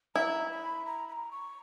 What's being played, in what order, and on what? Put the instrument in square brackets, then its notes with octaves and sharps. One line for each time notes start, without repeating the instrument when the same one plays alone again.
[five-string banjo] E4 [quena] A#5
[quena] B5
A#5
B5
A#5
C#6